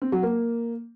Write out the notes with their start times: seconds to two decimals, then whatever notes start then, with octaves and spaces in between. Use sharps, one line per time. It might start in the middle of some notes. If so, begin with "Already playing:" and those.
0.02 C4
0.12 F#3
0.23 A#3